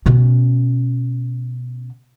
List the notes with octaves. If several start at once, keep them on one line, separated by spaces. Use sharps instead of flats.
B2 C#4